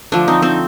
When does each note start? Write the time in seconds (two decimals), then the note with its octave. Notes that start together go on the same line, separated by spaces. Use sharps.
0.12 D3 F3 A3 D4
0.28 C4 D#4
0.42 C4 D#4